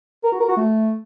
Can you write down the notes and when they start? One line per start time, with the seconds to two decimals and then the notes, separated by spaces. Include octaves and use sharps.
0.24 A#4
0.32 F#4
0.40 A#4
0.48 F#4
0.57 A3